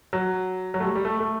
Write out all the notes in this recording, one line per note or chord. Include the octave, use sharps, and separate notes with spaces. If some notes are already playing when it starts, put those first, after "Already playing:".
F#3
F#3
A3
G3
G3
A3
A3